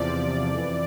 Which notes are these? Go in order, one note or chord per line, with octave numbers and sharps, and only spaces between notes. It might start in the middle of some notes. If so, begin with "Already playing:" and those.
Already playing: E2 C3 F3 D5
F2 E3